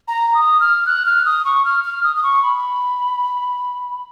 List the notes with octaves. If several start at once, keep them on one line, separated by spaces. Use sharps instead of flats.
A#5
D#6
F6
F#6
F6
D#6
C#6
F6
F6
D#6
D#6
C#6
B5